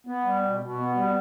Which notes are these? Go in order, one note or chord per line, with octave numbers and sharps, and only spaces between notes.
B3
G3
B2
B2
B3
G3